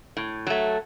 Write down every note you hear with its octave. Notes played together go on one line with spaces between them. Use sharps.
A2
F#3 A3